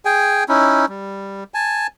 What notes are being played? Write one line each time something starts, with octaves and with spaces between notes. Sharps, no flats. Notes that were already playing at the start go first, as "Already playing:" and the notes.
G#4 G5 G#5
C#4 D#4 E4
G3
G#5 A5